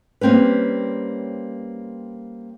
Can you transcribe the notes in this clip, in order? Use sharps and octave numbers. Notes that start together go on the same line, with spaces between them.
G3 A#3 C4 C#4 B4